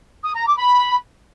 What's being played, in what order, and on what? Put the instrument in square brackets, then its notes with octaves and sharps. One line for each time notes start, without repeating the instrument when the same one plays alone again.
[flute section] D#6
A#5
D6
B5